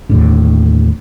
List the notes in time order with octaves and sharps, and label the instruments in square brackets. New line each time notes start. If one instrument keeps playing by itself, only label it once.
[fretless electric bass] D#2 A2 D3